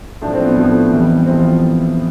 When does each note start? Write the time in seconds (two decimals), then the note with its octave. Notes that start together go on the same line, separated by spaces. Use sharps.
0.22 A2 D4
0.27 F3
0.34 C4
0.45 B3
0.57 A2 F3
0.91 F2 E3 G3
1.26 F2 E3 G3 C4
1.38 F4